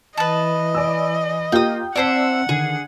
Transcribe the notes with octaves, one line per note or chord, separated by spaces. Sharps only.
E3 B4 D#5 A5
D5 G#5 E6
A#3 F4 G4 G5 D#6
C4 E4 C5 D5 E5 F#5 A5
D3 D#3 G#4